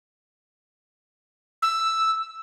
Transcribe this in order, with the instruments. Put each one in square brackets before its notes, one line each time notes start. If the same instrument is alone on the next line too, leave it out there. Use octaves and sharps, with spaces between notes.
[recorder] E6